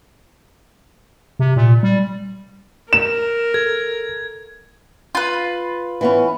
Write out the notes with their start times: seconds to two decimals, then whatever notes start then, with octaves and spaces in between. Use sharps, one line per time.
1.39 C3
1.56 A#2
1.83 G3
2.93 A#4 E7
3.54 A4 G#6
5.15 F4 B4
6.01 E3 B3 C#4